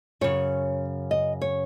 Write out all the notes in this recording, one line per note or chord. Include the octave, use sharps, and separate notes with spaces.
F#2 C#3 C#5
D#5
C#5